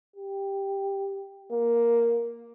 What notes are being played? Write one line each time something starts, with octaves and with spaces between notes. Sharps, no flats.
G4
A#3